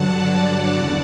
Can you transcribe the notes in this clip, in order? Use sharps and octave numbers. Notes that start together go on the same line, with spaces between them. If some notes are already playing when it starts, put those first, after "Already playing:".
Already playing: G2 D3 F#3 F#5 A5
D5 F#5
E2 C#3